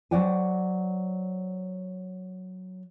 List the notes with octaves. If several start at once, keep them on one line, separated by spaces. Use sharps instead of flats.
F#3 C5 D5 F#5 G#5